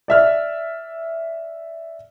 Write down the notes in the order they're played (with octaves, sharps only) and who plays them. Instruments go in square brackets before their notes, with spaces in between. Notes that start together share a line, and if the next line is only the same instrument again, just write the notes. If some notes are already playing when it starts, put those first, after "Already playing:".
[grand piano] D5 E5 F6